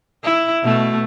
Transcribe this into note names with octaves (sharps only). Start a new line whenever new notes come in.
E4
B2 A3